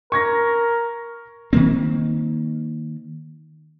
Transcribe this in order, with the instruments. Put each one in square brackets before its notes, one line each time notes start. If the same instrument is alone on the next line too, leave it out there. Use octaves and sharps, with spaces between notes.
[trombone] A#4 [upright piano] C#6 G#6 A#6
[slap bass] D#3 A#3 C4